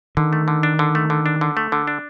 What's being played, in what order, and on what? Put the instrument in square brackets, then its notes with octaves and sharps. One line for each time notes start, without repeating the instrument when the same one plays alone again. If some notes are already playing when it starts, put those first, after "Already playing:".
[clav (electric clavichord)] D3 [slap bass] D#3
[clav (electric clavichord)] A3
D3
D4
D3
A3
D3
D4
D3
A3
D3
D4